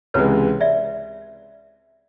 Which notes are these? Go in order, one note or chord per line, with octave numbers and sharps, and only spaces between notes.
C#2 C3 E3 G#3 B4 C#5
D5 E5